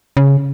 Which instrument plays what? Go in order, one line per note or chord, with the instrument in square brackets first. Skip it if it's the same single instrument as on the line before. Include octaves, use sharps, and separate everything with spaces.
[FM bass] C#3